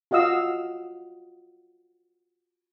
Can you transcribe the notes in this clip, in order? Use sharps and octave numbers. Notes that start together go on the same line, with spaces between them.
F4 F#4 D#5 F5 E6